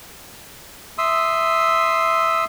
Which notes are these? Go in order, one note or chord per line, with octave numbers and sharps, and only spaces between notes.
E5 C6 D#6 E6